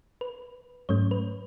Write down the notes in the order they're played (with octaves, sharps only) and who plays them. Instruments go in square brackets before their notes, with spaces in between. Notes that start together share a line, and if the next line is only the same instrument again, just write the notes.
[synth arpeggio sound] B4
G#2 F#3 A3 C#4 C#5
B4